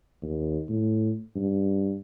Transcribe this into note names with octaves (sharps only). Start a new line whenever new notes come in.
D#2
A2
G2